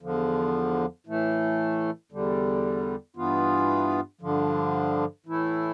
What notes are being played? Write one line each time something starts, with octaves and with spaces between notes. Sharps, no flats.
E2 D3 F3
A2 E3 A3
E2 D3 G3
G2 E3 B3 F4
G2 D3 F3
A2 E3 A3 E4